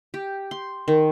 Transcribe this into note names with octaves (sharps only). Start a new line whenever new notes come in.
G4
C6
D#3